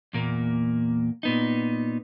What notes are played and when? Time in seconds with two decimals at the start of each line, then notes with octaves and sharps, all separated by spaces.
0.13 E2 A#2 A#3
1.23 A#2 B3 D#4